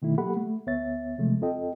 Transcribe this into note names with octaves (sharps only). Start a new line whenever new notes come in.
B2 D#3 A3 E4
F#3 A#3 G4 A4 F#5 B5
A3
D2 B3 C#5 E5 A6
C3 E3 F3 G#3 A3
E2 C4 F4 A4 D#5 G5